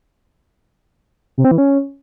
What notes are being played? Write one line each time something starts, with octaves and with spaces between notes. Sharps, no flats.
C3
C4
E3
C#4